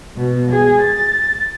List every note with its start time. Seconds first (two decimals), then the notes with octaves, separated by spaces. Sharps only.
0.16 B2
0.51 G#4
0.81 A6